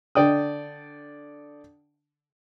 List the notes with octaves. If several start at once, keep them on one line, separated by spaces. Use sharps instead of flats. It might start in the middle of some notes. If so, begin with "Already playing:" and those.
D3 D5 G5 D#6